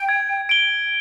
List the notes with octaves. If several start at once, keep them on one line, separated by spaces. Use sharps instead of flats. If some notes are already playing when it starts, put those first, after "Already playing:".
Already playing: G5
G#6
D7 G7